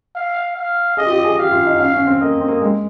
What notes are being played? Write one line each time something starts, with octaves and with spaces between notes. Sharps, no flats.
F5
F5
G#4 D#5
F4
G4
G#4
G4 F5
F4
D#4
C#4 F5
C#4
C4
A#3 D#5
C4
A#3
G#3